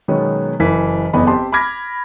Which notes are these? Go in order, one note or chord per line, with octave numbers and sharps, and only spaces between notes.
B2 D#3 F#3 G#3 B3 C#4
F#1 E3 A#4 B6
F#1 E2 B3 A4 D#5 B5
C4 G4 A5 C6
B5 D6 F6 G#6 A#6 B6